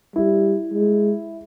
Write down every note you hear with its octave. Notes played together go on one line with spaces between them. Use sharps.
G3 E4
G#3